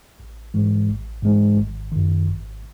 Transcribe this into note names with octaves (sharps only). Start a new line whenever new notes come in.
A1
G#2 E3 G#3
A1
G#2 E3 G#3
G#1
F#2 D#3
G#1